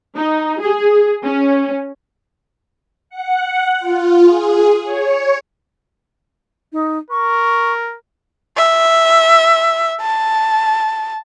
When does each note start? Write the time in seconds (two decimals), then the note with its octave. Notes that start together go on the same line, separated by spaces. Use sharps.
0.16 D#4
0.60 G#4
1.24 C#4
3.10 F#5
3.80 F4
4.23 G#4
4.84 C#5
6.72 D#4
7.10 A#4 C#6
8.57 E5
10.01 A5